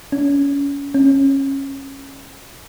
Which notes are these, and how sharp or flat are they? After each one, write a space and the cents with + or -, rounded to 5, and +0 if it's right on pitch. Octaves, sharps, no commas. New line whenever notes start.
C#4 +30
C#4 -20